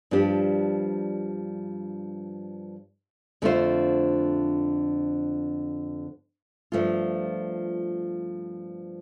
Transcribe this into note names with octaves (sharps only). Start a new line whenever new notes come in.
G2 F3 D4 G4
F2 D3 A3 F4 C5
G2 F3 A3 F4